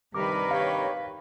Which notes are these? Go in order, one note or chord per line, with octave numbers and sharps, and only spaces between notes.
G2 C3 D#3 G3 A#4 B4 D6
G4 C#5 F5